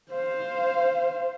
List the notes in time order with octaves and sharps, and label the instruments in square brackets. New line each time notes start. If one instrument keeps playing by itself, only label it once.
[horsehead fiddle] C5 F5